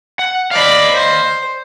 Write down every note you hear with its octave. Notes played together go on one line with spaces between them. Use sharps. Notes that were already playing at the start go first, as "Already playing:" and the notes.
F#5
D5 D#5 F5 B5
C5